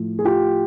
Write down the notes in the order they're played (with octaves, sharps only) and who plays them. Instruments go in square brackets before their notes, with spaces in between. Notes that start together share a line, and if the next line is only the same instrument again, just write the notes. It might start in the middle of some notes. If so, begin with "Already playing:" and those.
Already playing: [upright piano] A2 F3 A3
G#4
F4 G4